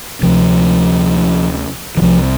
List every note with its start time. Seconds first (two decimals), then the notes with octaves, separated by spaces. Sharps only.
0.22 D2 C3 F3
1.97 E3
2.02 C2 C3 F3